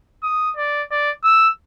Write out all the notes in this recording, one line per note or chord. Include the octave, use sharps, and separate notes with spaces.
D#6
D5
D5
E6